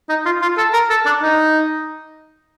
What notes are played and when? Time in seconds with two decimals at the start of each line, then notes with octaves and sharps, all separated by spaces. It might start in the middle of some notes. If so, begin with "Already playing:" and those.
0.09 D#4
0.25 F4
0.42 F4
0.57 A4
0.73 A#4
0.90 A4
1.06 D4
1.22 D#4